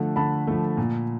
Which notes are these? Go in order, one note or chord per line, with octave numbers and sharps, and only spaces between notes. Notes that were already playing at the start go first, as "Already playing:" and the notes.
Already playing: D3 F3 A3
D3 A5 B5
F3 A3
A#2